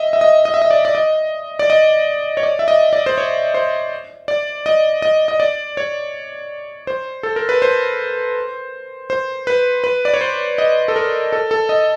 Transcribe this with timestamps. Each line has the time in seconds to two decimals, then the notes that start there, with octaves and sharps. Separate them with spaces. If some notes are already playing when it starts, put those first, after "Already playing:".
Already playing: D#5 E5
0.13 E5
0.21 D#5
0.45 D#5
0.54 E5
0.62 D#5
0.71 D5
0.85 D5
0.95 D#5
1.59 D5
1.70 D#5
2.37 C#5
2.43 D5
2.59 E5
2.68 D#5
2.93 D5
3.06 C5
3.18 C#5
3.54 C5
4.28 D5
4.66 D#5
5.02 D#5
5.28 D#5
5.40 D5
5.77 C#5
6.87 C5
7.23 A4
7.36 A#4
7.49 B4
7.62 C5
9.10 C5
9.47 B4
9.84 B4
10.05 D5
10.14 C#5
10.21 C5
10.58 D#5
10.88 A4
10.96 A#4
11.33 A4
11.51 A4
11.69 D#5